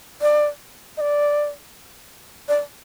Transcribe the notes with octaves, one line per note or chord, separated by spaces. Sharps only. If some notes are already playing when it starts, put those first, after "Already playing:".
D5
D#5
D5
D5